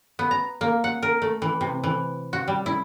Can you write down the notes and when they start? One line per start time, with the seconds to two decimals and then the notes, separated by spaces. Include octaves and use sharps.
0.19 B3
0.31 A#5
0.61 A#3
0.84 F#5
1.03 A#4
1.22 A3
1.42 E3
1.61 C3
1.84 E3
2.33 F#4
2.48 G3
2.66 E4